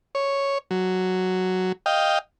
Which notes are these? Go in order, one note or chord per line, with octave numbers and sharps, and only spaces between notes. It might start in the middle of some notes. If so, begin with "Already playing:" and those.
C#5
F#3
D#5 F5 G5